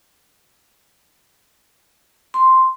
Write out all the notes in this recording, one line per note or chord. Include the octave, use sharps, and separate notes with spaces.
C6